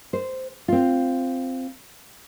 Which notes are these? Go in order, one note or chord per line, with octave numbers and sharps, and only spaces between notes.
C5
C4 F4